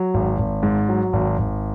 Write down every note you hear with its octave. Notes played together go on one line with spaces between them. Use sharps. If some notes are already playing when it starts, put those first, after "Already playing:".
Already playing: F#3
G#1
G#1
G#2
F#3
G#1
G#1